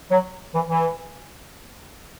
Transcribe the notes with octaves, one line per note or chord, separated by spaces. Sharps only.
F#3
E3
E3